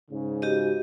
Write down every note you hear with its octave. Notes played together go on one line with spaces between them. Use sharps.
G#2 C#3
F#4 G4 D#5